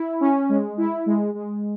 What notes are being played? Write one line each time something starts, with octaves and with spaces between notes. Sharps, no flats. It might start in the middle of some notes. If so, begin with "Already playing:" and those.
Already playing: E4
C#4
G#3
E4
G#3
G#3